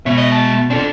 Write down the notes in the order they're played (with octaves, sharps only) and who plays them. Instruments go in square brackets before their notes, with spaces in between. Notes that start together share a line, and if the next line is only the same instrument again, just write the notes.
[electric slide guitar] B2 [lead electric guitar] G#3 E5 [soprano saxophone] C#5
[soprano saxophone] D#5
A5
[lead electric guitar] C4 A4 [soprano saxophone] D4